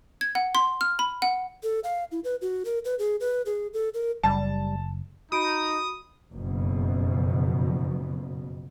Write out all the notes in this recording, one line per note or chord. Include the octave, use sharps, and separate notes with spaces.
G#6
F#5
C6
F6
B5
F#5
A4
F5
E4
B4
F#4
A#4
B4
G#4
B4
G#4
A4
A#4
F#1 G3 A5
D#4 F#4 B5 D#6 D7
F#1 F2 B2